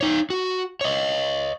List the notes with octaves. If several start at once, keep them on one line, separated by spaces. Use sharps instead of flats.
D#4 C#5
F#4
C#5 D#5